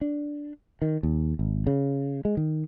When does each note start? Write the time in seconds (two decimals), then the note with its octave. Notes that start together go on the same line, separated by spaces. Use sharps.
0.01 D4
0.82 D#3
1.03 D#2
1.39 G#1
1.67 C#3
2.25 G#3
2.37 D#3